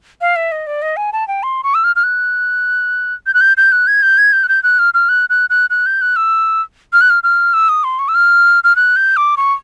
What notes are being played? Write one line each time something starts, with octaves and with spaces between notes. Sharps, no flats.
F5
E5
D#5
D5
D#5
G#5
A5
G5
C6
C#6
E6
F6
F6
F#6
G6
F#6
G6
G6
F#6
G#6
G6
G#6
G6
F#6
G6
F#6
F6
F6
F#6
F#6
F#6
F#6
G6
F#6
E6
F6
F#6
F6
F6
E6
D#6
C6
C#6
E6
F6
F6
F#6
G6
D6
C#6